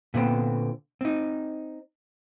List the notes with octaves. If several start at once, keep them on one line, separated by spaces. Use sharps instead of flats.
A#2 D3 B3 C4
C4 D#4